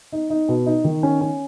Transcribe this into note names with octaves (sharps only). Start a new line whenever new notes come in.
D#4
D#4
B2
D#4
D#3
C#4
C#4